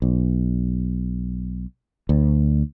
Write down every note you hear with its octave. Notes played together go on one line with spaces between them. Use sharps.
B1
D2